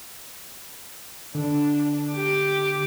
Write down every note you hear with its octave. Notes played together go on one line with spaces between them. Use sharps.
D3 D4
G4 D6